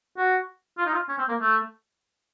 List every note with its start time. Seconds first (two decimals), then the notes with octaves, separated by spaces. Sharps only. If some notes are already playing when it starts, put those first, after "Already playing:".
0.17 F#4
0.78 F4
0.86 D#4
0.93 F4
1.08 C#4
1.18 C4
1.28 A#3
1.38 A3